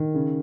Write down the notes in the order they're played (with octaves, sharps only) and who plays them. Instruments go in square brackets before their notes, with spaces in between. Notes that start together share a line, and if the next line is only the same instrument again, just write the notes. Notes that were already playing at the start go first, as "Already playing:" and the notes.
Already playing: [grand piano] D#3
C#3